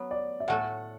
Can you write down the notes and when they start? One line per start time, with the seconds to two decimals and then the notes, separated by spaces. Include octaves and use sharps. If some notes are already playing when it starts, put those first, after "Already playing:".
Already playing: F#3 B3
0.11 D5
0.40 E5
0.48 A2 A3 F#4 A4 F#5